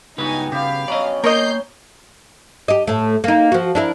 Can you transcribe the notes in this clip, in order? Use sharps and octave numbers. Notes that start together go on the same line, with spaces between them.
C#2 G2 B3 D#4 F#4 B4 G#5
C#3 B3 G4 F5
F#3 C#4 D5 D#5
A#3 A#4 C#5 D#5 A#5 G6 C7
G4 D#5
A2 A3
A#3 D#4
F3 F#4
D4 E4 A#4